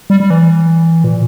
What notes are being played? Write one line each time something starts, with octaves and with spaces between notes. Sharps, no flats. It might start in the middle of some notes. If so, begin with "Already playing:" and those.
G3
G3
E3
A#2